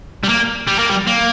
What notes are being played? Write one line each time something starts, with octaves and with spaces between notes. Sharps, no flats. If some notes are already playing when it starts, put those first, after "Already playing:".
G3
A#3
G3
A#3
G3
A#3